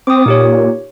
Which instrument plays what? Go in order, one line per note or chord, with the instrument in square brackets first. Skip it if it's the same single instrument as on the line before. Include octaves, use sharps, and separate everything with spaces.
[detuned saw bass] C4 [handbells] D6 D#6
[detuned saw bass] A#2 [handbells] D#4 G4 C#5